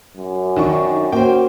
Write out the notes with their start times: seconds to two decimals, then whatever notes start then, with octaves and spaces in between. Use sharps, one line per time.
0.16 F#2
0.57 D#3 D4 C#6
1.12 A#3 C#4 F#4 C5 G5